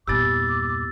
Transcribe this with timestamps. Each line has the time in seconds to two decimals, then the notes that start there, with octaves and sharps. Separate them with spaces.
0.08 E2 G2 A#2 B3 G4 D6 E6 A6